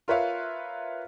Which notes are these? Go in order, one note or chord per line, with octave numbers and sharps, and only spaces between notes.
F4 A#4 B4 C#5 E5 F5